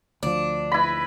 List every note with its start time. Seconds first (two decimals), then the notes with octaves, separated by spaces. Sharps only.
0.23 D2 F3 D4
0.72 E4 B4 D#5 B5